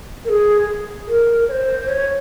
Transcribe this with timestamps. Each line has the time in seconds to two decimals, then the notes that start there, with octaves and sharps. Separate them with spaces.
0.25 A#4
0.29 G#4
1.08 A#4
1.48 C#5
1.52 C5
1.88 C#5